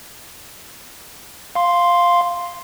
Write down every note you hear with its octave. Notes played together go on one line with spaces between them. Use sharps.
F5 C6